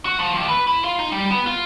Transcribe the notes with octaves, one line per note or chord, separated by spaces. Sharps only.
F#4
F3
D#2
B4
E4
F4
D#4
G3
B3
F4